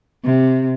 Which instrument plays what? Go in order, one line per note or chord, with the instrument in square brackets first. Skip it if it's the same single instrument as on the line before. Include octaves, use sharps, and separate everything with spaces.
[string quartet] C3